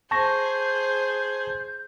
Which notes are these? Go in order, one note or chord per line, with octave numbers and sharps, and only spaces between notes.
G#4 C5 A5 C#6 G6 A#6